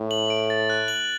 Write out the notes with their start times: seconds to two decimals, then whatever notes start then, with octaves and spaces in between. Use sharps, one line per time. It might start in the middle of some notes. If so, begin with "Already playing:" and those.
Already playing: A2
0.11 F#7
0.30 D7
0.50 A6
0.70 F#6
0.88 F#7